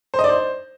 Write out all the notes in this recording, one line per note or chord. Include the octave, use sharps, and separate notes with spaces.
C5
D#5
D5
C5